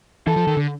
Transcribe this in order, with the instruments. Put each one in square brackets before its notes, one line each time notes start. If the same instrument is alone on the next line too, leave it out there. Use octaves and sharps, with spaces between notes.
[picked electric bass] E3 [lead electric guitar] A4
[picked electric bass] F3
D#3
D3